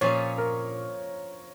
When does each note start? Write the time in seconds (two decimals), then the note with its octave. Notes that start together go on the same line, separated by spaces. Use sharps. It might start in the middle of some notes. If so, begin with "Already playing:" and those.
0.01 A#2 F3 C#4 G#4 C#5
0.38 A#4